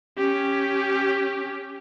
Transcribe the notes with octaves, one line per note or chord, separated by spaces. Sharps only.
C#4 G4